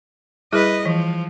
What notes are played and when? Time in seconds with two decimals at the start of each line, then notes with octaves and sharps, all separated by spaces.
0.53 G3 E4 G#4 B4 D#5
0.86 E3 F3